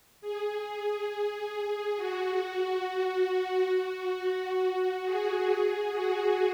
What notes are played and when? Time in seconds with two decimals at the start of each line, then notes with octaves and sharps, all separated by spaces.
0.21 G#4
1.97 F#4
3.72 F#4
4.02 F#4
4.31 F#4
4.61 F#4
5.05 G#4
5.48 G#4
5.92 F#4